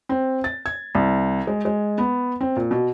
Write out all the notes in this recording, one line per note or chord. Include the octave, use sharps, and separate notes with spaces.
C4
A6
G#6
C2
G#3
G#3
B3
C4
A#2
B2